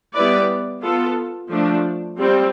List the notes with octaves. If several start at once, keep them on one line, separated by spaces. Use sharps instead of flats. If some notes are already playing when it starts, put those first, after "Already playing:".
G3 B3 E4 B4 D5
B3 F4 A4
F3 A3 D4
G3 C4 F4